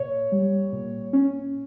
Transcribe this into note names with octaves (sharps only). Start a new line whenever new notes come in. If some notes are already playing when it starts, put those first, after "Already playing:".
Already playing: A#2 C#5
G3
A#2
C#4